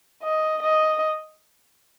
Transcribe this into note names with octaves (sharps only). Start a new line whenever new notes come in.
D#5
D#5